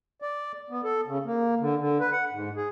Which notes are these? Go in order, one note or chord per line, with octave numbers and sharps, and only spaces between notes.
D5
B3
A4
C#3
A#3
D3
D3
B4
F#5
G#2
G#4